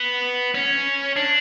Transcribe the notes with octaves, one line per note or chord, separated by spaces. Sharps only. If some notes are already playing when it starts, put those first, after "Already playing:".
Already playing: B3
C#4
D4